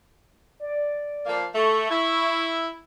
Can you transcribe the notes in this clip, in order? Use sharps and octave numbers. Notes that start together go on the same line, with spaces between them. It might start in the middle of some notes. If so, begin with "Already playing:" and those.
D5
F3 A#3
A3 C#6
E4